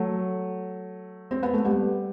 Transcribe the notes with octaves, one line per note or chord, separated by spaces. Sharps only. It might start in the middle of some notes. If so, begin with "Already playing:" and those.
Already playing: F#3 A3
C4
B3
A3
G3 B3